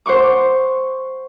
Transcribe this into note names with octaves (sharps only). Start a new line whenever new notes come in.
C5 F#5 C#6 D6